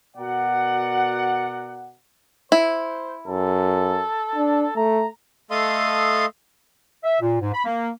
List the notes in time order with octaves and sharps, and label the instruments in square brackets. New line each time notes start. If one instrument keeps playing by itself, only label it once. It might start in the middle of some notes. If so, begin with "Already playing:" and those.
[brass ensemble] B2 F#4 A#4 D5 F#5
[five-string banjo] E4 [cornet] C5
[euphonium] F#2 [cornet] A4
[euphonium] D4
[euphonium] A3 [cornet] A#5
[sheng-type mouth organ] A3 A4 D#5 F5 C6 D#6
[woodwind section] E5
A#2
G#2
B5
A#3